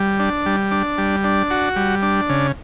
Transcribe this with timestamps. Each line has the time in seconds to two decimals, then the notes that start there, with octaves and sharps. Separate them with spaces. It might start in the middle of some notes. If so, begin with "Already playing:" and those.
Already playing: G3
0.19 D4
0.46 G3
0.71 D4
0.98 G3
1.24 D4
1.51 F#4
1.76 G3
2.02 D4
2.29 C#3